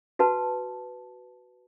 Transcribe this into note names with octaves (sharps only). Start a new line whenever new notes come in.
F#4 B4 A5